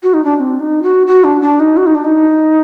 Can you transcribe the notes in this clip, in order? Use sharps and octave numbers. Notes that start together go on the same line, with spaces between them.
F#4
D#4
D4
D4
C4
D#4
F#4
F#4
D4
D4
D#4
F#4
D#4
D4
D#4